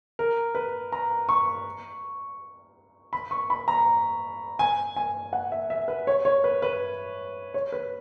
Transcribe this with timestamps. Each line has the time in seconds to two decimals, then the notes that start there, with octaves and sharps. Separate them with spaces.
0.19 A#4
0.55 B4
0.92 A#5
1.29 C#6
3.13 B5
3.31 C#6
3.50 B5
3.68 A#5
4.59 G#5
4.96 G#5
5.33 F#5
5.52 E5
5.70 E5
5.88 B4
6.07 C#5
6.25 C#5
6.44 B4
6.62 B4
7.54 C#5
7.72 B4